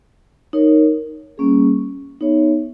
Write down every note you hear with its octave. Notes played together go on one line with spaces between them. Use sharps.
D#4 A#4 C#5
G3 A#3 C#4 G#4
B3 D#4 G#4 C#5 E5